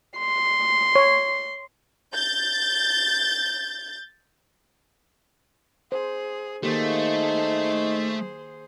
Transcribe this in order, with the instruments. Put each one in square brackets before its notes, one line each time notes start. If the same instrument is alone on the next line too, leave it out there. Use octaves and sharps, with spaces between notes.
[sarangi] C6
[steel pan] C#5
[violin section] G6 A6
[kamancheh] G#4 [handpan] C5
[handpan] D#3 A#3 G4 [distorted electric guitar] A3 [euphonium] D#4 [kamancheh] G#4 C5